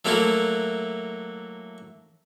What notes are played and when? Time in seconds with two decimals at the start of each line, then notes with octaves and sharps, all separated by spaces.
0.05 F#3 A3 A#3 E4 F#4